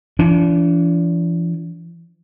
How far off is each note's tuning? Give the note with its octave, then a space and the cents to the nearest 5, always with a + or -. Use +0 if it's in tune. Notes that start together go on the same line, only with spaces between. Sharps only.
E3 +45 D4 -35